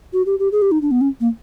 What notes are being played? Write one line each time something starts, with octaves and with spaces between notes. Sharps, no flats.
F#4
G4
G4
G#4
G4
D#4
D4
B3
C#4
A#3